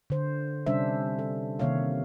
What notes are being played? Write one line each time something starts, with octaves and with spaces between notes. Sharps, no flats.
D3 C5
C3 G3 C#4 D4 C5 E5
A4
C3 D#3 A#3 C#5 E5 F5